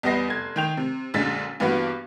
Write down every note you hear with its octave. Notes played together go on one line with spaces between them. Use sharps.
E2 G3 B3 D#5 A#6 C7
F1 G#6
D#3 G5 F7
C3
A#1 F#2 D3 G#3 A6 B6
G2 E3 A#3 B3 F#4